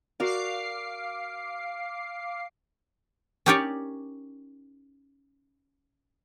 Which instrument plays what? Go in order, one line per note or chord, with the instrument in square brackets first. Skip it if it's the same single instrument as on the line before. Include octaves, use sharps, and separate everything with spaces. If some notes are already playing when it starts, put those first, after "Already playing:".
[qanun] F#4 A#4 D5 [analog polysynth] F5 D6 C7
[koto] C#4 D#4 G4 A#4 C#5 D5